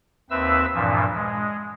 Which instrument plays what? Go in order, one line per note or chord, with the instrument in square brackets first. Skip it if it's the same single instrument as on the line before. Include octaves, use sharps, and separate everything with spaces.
[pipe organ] D#2 C4 B4 E5 E6
G2 A#2 E3 F3
G#3